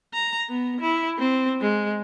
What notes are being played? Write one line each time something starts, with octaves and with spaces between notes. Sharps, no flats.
A#5
B3
E4
C4
G#3